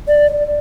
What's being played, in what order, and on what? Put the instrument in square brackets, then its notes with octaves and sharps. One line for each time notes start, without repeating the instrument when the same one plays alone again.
[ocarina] D5